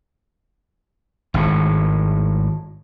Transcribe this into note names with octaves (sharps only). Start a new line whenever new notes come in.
G#1 A2